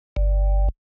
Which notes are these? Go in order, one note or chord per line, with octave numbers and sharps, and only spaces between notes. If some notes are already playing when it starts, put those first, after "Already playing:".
G1